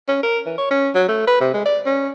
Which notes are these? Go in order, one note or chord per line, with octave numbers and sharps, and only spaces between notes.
C#4
A#4
E3
C#5
C#4
F#3
A3
B4
C3
G#3
D5
C#4